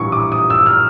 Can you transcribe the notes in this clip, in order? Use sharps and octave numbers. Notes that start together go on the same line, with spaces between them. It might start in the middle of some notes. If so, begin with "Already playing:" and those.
Already playing: A#1 A2 E3 G3 C#6
D6
D#6
E6
F6